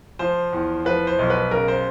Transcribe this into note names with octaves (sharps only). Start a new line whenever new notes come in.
F3 C5
E2
F3 B4
C5
B1
B4
C#3 A#4
C5